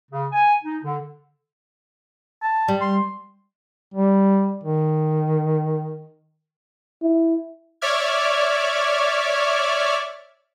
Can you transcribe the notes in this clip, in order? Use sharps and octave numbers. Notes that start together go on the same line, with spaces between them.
C#3
G#5
D#4
D3
A5
G3
C6
G3
D#3
E4
C#5 D5 E5 D6 F6 G#6